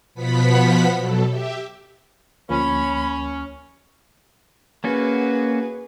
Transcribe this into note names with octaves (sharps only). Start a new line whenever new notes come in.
B2 F3 B3 F#5 B5 B6
B2 F#3 A4
G4 E5
D2 F3 A#3 C#4 C#5 B5
A#3 C#4 F#4 G#4 B4